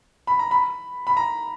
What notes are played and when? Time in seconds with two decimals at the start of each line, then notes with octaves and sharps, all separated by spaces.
0.27 B5
0.39 A#5
0.51 B5
1.07 B5
1.17 A#5